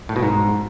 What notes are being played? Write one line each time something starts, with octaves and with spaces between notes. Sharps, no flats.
A2
B2
G#2